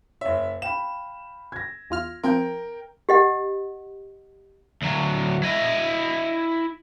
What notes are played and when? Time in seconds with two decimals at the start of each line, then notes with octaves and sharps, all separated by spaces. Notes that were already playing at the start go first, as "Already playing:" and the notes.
0.21 F#1 C#5 E5
0.62 F5 G5 B5 E7
1.52 G#6 A#6
1.90 E2 F4 F6
2.23 F3 C4 A#4 G5 G6
3.09 G4 D#5 F#5
4.82 D2 F#3
5.43 E4 D#5